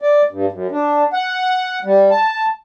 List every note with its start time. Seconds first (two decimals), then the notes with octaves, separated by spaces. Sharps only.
0.01 D5
0.30 G2
0.52 F#2
0.72 D4
1.13 F#5
1.84 G3
2.11 A5